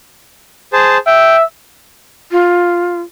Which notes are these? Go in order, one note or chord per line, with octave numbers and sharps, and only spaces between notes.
G#4 C5 A5
E5 G5
F4